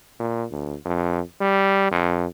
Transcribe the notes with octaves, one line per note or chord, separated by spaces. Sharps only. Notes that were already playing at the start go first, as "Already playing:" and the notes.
A#2
D2
F2
G3
F2